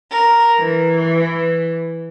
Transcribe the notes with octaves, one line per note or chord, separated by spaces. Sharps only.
A#4
E3